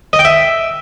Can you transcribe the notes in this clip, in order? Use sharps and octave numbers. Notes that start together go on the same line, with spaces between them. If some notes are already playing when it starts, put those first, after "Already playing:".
D#5
G5
E5